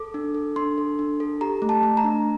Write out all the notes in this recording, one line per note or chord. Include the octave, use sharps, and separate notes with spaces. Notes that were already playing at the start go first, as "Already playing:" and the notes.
Already playing: A4 D6
D4
A4
D4 C6
A4
D4
A4
G4 A#5
A3
A5
A3
A#5
D4